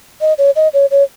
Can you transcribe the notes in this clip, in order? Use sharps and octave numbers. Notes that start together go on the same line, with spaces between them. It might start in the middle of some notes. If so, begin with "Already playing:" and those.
D#5
C#5
D#5
C#5
C#5